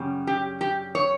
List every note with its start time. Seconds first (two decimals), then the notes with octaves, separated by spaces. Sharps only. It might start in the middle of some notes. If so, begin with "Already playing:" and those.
Already playing: F#2 C#3 G3
0.27 G4
0.61 G4
0.95 C#5